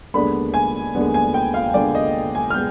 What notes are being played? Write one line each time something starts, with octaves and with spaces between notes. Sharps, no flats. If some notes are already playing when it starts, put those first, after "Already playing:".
D#2 D3 G#3 B3 D4 B5
G#5
D#2 D3 G#3 B3 D4
G#5
G5
F5
D#2 D3 G#3 B3 D4 D5
D#5
G#5
F6
G#3 B3 G6